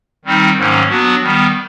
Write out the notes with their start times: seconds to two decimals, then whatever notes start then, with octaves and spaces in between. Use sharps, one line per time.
0.25 D#3 G3 C4 D#4
0.56 G#2 D#3 F#3 A#3 C#4
0.89 F#3 B3 D4 F#4
1.21 D#3 G3 B3